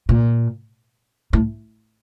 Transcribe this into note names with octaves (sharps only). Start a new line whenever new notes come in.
A#2
A2